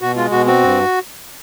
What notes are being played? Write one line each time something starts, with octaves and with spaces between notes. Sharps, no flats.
B2 F#4
G#3 F4
B2 F#4
C4 F#4
G2